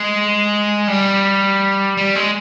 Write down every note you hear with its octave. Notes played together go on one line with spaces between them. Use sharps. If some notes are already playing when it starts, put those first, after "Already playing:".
Already playing: G#3
G3
G3
G#3